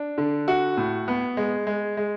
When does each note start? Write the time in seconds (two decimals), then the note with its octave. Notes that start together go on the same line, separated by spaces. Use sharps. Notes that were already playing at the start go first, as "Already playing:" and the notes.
Already playing: D4
0.18 D3
0.48 F#4
0.77 A2
1.08 B3
1.37 G#3
1.67 G#3
1.97 G#3